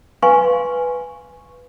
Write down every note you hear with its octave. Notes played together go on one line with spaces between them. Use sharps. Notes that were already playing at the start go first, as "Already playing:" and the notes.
B4 F5 G#5 C6 C#6